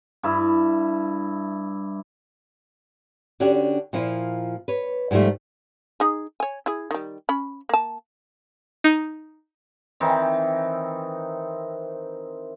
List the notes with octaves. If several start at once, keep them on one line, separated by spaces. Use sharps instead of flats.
G2 E4
D3 C#4 D4 F#4 G4
A#2 F3 E4 F4
B4 C#5
G#2 D3 F3 G3 A3
D#4 G#4
C#5 G#5
E4 G#4
D#3 G3
C#4 B5
A#3 A5
D#4
D#3 E3 C4 D#4